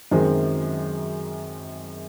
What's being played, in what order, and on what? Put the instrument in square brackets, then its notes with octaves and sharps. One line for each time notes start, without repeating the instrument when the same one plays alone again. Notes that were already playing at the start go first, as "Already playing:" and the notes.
[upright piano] F#2 D#3 G#3 C4